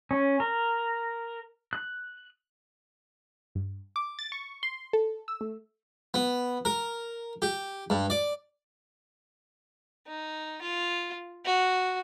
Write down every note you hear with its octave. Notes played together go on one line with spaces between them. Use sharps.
C#4
A#4
F#6
G2
D6
A6
C#6
C6
A4
E6
A3
B3
A#4
G4
G2
D5
D#4
F4
F#4